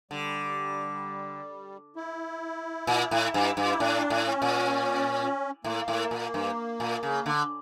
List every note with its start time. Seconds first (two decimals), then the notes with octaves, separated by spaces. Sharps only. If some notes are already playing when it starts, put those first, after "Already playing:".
0.11 D3 G3
1.96 E4
2.87 A#2
3.11 A2
3.34 G2
3.57 G2
3.66 F4
3.72 E4
3.80 A2 D4
4.10 A2
4.26 C#4
4.42 A#2
5.64 A2 A#3
5.88 A2
6.11 A#2
6.34 G2
6.80 A#2
7.03 C#3
7.26 D3